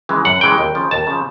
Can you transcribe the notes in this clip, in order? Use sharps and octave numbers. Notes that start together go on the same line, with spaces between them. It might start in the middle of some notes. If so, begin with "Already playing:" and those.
C#3 E3 G#3
F#2 F#5
C#3 E3 G#3 G5
D#2
C#3 F3
D#2 A5
C#3 F3